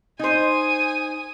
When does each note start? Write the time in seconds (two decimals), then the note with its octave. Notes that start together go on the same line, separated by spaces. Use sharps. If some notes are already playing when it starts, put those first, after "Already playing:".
0.19 D#4 C5 G#5 D#6